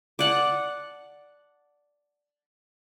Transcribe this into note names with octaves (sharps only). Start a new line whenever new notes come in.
D5 F#5 A5